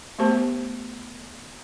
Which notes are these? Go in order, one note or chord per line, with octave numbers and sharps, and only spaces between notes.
A3 B3 G4 C5 A5